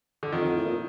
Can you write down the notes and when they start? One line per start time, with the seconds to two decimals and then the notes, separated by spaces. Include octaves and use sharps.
0.23 D3
0.32 F2 D#3
0.44 F2
0.56 A2
0.65 A#2